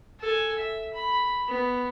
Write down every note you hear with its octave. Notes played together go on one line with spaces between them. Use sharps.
A4 G#5
E5
B5
B3